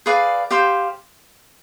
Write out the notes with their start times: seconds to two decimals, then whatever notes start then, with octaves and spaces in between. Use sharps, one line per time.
0.06 G#4 B4 D5 F5
0.51 G4 C5 F5